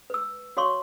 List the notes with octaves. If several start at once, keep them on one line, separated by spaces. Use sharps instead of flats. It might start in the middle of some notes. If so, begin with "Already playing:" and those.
B4 E6
F#4 C#5 F5 C6 C#6